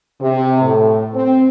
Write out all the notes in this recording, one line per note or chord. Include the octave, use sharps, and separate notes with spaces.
C3
A2
C4